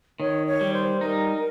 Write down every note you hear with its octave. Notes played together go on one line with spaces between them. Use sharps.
D#3 C#5
C#5
G3
C5
D#4 A#4